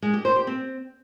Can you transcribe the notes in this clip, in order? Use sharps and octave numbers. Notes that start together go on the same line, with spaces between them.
G#3
G4
C5
G4
C4